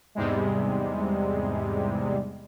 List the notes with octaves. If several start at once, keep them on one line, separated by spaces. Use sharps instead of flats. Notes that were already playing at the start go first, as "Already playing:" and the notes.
E2 G#2 C3 G3 G#3